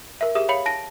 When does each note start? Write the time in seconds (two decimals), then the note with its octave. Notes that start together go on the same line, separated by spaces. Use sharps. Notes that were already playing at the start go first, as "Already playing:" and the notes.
0.21 A#4 E5
0.35 G4 G#4 E5 D#6
0.49 C#5 F5 B5 C#7 F#7
0.66 A5 A#6 D7